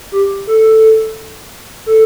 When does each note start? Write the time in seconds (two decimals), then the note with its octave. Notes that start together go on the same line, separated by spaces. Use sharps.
0.12 G4
0.47 A4
1.86 A4